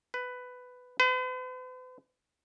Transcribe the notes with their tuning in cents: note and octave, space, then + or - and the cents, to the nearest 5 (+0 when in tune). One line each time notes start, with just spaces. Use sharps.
B4 +10
B4 +45